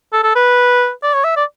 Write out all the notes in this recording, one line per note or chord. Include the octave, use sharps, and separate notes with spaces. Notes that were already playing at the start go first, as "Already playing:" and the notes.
A4
A4
B4
D5
C#5
E5
D5